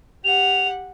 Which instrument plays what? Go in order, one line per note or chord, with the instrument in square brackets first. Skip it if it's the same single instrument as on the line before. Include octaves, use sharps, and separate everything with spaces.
[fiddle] G4 F#5 [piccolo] F7